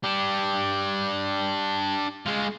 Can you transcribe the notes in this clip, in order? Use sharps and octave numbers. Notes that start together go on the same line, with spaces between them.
D4 G4
G#3 F4